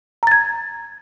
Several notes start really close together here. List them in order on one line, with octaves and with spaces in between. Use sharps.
A#5 A6 G#6